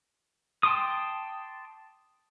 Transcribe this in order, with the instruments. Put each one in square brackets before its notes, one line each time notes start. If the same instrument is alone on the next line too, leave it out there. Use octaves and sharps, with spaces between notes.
[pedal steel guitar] G5 A5 C6 D6 D#6